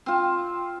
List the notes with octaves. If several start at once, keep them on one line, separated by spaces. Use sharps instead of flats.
C4 F4